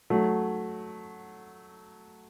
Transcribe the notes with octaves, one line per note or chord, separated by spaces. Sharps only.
F#3 A3